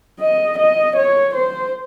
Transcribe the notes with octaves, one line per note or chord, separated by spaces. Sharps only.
D#5
D#5
C#5
C5